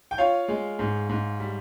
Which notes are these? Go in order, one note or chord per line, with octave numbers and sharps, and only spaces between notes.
G5
F4 C#5 F5
G#3
G#2
G#2
G3